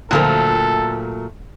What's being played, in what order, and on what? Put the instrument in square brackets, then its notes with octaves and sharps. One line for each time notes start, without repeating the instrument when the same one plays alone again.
[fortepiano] D2 F3 A#4 [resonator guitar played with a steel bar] A#2 F#3 A3 [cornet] A4